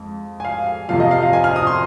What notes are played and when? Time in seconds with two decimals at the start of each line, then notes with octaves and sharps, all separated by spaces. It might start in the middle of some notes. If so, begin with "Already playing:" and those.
Already playing: F2 G#3
0.40 G#5
0.45 F5
0.89 F2 C3 F3 F5
1.00 D#5
1.11 F5
1.23 F5
1.33 G#5
1.44 F6
1.56 D#6
1.67 C6